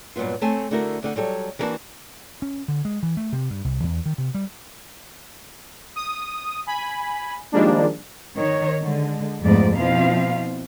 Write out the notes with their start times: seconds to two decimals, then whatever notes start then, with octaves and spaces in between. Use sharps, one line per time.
0.16 G2 A#2 F#3 B3 F4
0.41 A3 C4 C#5 G#5 A5
0.71 D3 A3 E4 F#4 A#4
1.03 D2 D3 F#5
1.16 F#3 G3 A4 C#5
1.59 E3 G#3 A#3 D4 F#4 A5
2.42 C#4
2.68 D3
2.85 G#3
3.03 E3
3.17 A3
3.33 C3
3.50 G2
3.65 C2
3.84 E2
4.06 D#3
4.18 C3
4.35 G3
5.96 D#6
6.66 G#5 B5
7.52 D#3 F3 G3 G#3 A#3 D4
8.36 D#3 C#5
8.81 D3 G#3
9.42 F2 G#2 F3 A3 B3 D5
9.76 B2 F3 C4 E4 F5